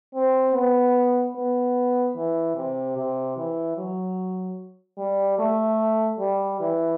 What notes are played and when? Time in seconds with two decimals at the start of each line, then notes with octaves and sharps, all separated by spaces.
0.15 C4
0.55 B3
1.36 B3
2.16 E3
2.56 C3
2.97 C3
3.37 E3
3.77 F#3
4.98 G3
5.38 A3
6.19 G3
6.60 E3